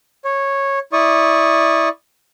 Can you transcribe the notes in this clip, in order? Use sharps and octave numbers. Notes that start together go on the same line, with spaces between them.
C#5
E4 D5 C#6 D#6